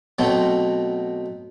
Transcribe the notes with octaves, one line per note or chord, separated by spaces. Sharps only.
B2 F#3 A3 C4